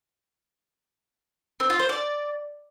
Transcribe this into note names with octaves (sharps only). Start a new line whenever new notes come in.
C4
F4
C5
D5